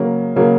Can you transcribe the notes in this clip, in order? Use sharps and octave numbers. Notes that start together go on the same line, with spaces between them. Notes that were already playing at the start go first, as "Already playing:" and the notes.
Already playing: C#3 F#3 A#3
C#3 F#3 A#3